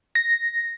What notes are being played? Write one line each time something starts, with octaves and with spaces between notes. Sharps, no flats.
A#6